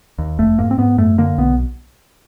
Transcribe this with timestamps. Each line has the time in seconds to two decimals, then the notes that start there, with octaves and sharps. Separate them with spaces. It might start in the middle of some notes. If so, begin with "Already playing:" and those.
0.18 D#2
0.38 F1 A3
0.58 G#2 A#3
0.71 C4
0.78 G#2 B3
0.98 F#2 A3
1.18 D3 A#3
1.38 B1 B3